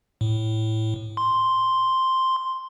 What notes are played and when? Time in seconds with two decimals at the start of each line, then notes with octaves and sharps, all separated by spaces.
0.21 A2
1.17 C6